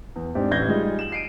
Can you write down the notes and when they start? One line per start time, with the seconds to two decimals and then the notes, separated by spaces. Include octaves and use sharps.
0.16 E2
0.35 G#2 C4 D4 G4
0.51 A1 A2 G6 G#6 A#6 G7
0.69 G3 G#3 D#4 F4 G#4
0.99 E7 F#7
1.12 C7 D7 D#7